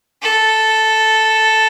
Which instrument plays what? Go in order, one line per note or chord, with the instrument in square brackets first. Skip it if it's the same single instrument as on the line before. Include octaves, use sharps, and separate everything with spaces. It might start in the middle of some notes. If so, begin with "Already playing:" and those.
[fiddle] A4